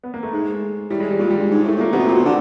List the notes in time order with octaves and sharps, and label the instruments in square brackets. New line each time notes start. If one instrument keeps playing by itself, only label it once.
[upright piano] B3
A#3
A3
[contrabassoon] G#2 [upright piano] G#3
[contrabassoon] A2 [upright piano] G3
[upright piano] G#3
G3
[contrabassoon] A#2 [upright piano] G#3
[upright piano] G3
[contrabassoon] G2
G#2
[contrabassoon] A2 [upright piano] A3
[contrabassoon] A#2
[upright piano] A#3
[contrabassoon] C3 [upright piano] B3
[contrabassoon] B2
[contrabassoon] A#2 [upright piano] C4
[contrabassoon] B2
D3